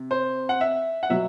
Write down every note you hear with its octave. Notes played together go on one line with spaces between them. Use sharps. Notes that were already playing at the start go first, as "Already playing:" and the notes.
Already playing: C3
C5
F#5
E5
F#5
B2 F#3 E5